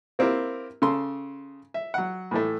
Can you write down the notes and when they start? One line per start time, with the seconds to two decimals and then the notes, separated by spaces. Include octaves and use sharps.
0.19 A#3 C4 E4 G4 A#4
0.82 C#3 A4 C6
1.74 E5
1.94 F#3 F#5
2.31 A2 E3 A3